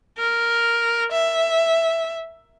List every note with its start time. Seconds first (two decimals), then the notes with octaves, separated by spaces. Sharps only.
0.18 A#4
1.12 E5